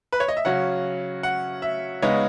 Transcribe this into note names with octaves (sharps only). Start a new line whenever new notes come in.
B4
C#5
D#5
E5
C#3 F#3 C#4 F#5
F#5
E5
C#3 G#3 B3 D#4 C#5